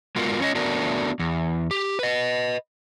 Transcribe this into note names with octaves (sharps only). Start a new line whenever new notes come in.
G#3 B3 F4 F#4 A#4
C#4 C#5 D#5
A3 B3 D4 F#4 A#4
E2
G4
B4 D#5